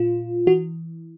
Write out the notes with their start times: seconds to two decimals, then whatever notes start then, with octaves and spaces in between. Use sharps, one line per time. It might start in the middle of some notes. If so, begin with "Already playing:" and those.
Already playing: A#2 F4
0.47 E3 F#4